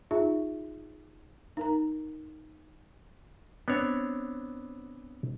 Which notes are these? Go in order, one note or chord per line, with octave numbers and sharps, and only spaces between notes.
D#4 F4 G#4 E5
D#4 A#4 A#5
B3 C4 D4 C5 C#5